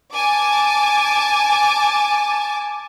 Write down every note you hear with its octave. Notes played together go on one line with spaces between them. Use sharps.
G#5 A5 D6